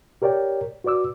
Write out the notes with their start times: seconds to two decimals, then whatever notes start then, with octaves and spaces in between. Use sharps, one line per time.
0.22 G4 A#4 C#5 D5 G5
0.84 F#4 B4 D5 D6 E6